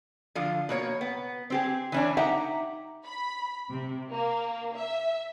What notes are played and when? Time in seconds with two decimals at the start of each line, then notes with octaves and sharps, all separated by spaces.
0.35 D3 F3 F4
0.69 B2 A#3 C#5
1.01 B3
1.50 C4 G4 G#4
1.92 E3 C#4 D4
2.17 D#4 G4 E5 F#5 A#5
3.04 B5
3.71 C3
4.10 A#3
4.74 E5